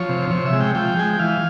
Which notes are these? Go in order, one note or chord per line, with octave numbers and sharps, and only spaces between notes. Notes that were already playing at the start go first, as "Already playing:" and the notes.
Already playing: F3 C#5
C3
C3 C#5
E5
G#3
G5
F3 G5
G#3 G#5
G5
E3 F5